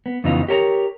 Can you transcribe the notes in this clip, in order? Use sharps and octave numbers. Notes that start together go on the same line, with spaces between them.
B3
F2 C#3 E3 B3 D#4 F4
G4 A#4 C#5 A5 A#5